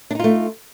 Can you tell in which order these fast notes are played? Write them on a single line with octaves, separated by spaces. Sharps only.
D4 D#4 F4 A3